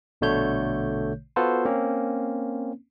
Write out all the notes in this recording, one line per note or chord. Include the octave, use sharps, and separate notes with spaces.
A#1 B2 D3 A3 C#5 G6
B3 F4 F#4 A4 B4 C5
A#3 C4 C#4